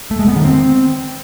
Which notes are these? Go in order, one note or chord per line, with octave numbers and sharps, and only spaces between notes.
A3
G#3
B3
D#3
C4